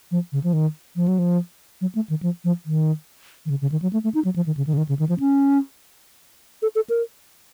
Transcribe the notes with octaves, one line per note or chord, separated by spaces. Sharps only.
F3
C#3
F3
D#3
F3
F#3
F3
F#3
A3
D#3
F3
F3
D#3
D#3
C#3
C#3
D#3
F#3
A3
A3
D#4
F#3
F3
D#3
C#3
D#3
C#3
D#3
C#3
D#3
F3
C#4
A4
A4
A#4